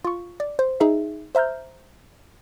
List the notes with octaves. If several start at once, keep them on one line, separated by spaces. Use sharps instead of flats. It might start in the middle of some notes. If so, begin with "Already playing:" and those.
F4 C#6
D5
C5
D#4 G#4 E5
C5 E5 A#5 F6 G6